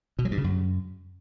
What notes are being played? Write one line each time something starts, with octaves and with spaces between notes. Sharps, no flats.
B2
F#3
G2
C#3
F#2